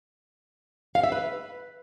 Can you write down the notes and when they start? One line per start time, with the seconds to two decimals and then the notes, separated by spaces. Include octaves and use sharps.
0.95 F5
1.04 E5
1.12 B4